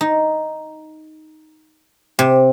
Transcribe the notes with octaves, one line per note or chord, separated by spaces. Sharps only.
D#4
C3